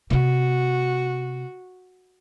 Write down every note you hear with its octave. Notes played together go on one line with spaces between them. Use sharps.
C3 B3 F#4